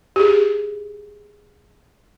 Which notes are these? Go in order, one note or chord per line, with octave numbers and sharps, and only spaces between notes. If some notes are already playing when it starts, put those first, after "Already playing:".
G4 G#4